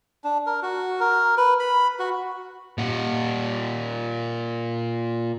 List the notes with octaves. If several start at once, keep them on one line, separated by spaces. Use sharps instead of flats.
D4
A#4
F#4
A#4
B4
B5
F#4
A#2 F#5